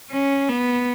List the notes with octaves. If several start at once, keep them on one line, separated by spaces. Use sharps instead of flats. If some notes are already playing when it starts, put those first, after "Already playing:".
C#4
B3